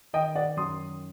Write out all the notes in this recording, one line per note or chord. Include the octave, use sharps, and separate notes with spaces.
D#3 D#5 G5
D5 F#5
F#2 C6 D#6